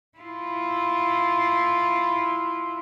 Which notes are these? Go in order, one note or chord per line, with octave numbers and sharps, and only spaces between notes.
E4 F4